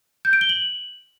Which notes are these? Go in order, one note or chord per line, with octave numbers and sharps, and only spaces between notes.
G6
D7
G7
F#7